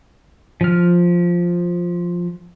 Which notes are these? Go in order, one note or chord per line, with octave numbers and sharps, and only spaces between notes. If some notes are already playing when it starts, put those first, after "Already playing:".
F3 F6